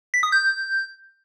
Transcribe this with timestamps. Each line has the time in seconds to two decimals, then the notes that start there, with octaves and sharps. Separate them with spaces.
0.14 B6
0.23 D#6
0.32 G6